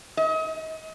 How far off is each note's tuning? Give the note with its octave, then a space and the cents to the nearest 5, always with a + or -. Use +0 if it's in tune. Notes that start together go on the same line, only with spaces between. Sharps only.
D#5 +35